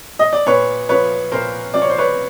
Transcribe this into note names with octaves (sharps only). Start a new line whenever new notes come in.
D#5
D5
A#2 B4 C#5
F3 B4 C#5
A#2 A#4 C5
F3 D5
C#5
C5
B4 C#5